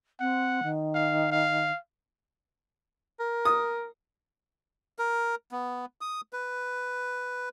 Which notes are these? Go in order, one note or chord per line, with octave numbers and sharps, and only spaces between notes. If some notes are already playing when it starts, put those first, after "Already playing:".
C4 F#5
D#3
F5
F5
A#4
D#6
A#4
B3
D#6
B4